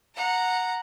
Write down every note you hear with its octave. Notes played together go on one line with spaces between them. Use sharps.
F#5 A#5